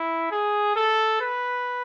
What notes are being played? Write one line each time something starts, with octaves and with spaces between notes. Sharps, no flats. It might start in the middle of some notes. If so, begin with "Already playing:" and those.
Already playing: E4
G#4
A4
B4